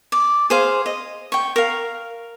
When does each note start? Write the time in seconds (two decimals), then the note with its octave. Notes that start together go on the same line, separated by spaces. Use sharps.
0.12 D5
0.50 G#4 C5 F5
0.86 D#5
1.32 G5 C#6
1.56 A#4 F5